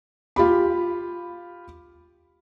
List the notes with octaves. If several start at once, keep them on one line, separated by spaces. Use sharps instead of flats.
F4 G4 B5